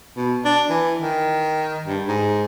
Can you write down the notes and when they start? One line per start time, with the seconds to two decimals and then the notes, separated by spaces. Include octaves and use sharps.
0.16 B2
0.44 D4
0.69 E3
1.02 D#3
1.87 G2
2.07 G#2